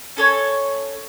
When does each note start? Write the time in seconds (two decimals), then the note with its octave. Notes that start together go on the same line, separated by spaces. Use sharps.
0.16 C#4 A4 C#5